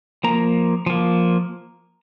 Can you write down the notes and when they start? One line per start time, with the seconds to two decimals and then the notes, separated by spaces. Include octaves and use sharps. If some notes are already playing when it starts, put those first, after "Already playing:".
0.24 F3 A#3 A#5
0.86 F3 A#3